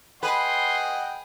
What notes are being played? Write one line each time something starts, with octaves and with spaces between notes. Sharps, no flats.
G#4 B4 D#5 F#5 G5 C6